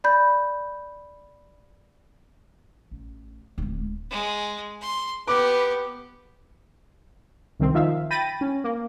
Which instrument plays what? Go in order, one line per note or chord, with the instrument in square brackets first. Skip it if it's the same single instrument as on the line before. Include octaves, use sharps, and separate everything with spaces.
[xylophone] D5 B5 G6
[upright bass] A1
D1 G#3
[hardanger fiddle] G#3
C6
[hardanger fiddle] B3 G4 [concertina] B4 [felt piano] D6
[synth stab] C2 D#3 C4
D#3 F3 E5 F5
G5 B5 A6 A#6 D#7
C#4
A#3